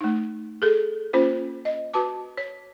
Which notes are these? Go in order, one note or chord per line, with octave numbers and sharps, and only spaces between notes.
A3 D#4
G#4 A4
A#3 C#4 F4 C5
D#5
F#4 B4 A5 D6
C#5